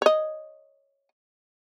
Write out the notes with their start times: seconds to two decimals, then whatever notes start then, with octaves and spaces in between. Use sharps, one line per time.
0.02 C#5 D#5